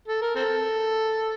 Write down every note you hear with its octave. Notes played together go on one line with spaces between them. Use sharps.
A4
A#4
C4 A4